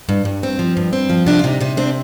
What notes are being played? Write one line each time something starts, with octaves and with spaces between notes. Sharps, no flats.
G2
G2
C4
F3
G2
C4
F3
C3 D4
F4
C3 D#4
C3 D#4
C4 D4